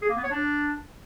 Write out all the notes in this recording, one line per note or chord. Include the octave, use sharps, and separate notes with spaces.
G#4
A#3
B3
C#5
D4